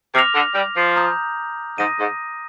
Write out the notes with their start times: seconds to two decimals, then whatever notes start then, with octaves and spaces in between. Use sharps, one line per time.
0.14 C3 D6 F6 A#6 F7
0.35 D3
0.55 G3
0.76 F3
0.96 A#5 D#6 G6
1.78 G#2 D#6 A#6 D#7
1.99 G#2